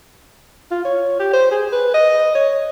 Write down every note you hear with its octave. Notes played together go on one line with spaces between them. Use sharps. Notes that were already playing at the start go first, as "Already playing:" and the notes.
F4
C#5
G4
C5
G#4
B4
D#5
C#5